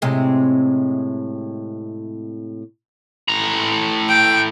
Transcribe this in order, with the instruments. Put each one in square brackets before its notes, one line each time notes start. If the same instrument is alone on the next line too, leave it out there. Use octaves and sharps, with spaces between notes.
[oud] A2 C3 G#3
[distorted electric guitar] A2 A#5
[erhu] G5